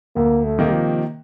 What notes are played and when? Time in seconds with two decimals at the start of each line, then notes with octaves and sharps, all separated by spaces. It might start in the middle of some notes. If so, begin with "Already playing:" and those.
0.16 D2 A#3
0.44 A3
0.59 C3 D#3 A#3
0.73 F3